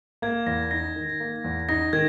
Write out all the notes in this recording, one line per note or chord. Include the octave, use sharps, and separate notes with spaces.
A#3 G#6
E2 A#6
D#4 A#6
D#3
A#3
E2
D#4 A#6
D#3 G#6